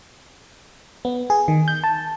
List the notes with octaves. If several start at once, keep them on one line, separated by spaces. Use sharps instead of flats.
B3
G#4
D#3
G6
A5